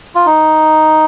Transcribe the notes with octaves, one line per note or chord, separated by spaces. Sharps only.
F4
D#4